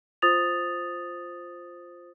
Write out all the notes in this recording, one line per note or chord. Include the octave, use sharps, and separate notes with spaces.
F4 C5 D#6 A6 F7